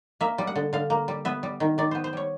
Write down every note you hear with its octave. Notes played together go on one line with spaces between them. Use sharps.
A#3 E5
G3
F#5
D3
D3 F5
A#3
G3
B3 E5
G3
D#3
D#3 D5
B3 C5
C5
G3 C#5